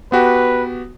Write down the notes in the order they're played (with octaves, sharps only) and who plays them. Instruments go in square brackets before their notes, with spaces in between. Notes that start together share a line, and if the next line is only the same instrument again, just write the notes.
[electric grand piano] B3 F#4 G4 [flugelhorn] B4